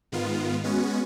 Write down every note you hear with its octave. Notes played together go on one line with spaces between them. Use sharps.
G#2 D#3 B3 F4
G#3 B3 C#4 F#4